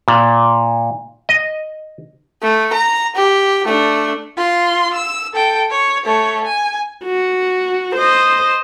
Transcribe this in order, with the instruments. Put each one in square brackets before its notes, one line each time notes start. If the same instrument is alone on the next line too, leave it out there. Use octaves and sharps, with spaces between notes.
[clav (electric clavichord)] A#2
D#5
[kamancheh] A3
A#5
G4
A3 D4
F4 C6
E6
A4 G5
C#5
A3 C#5
G#5
[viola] F#4
C5 D#5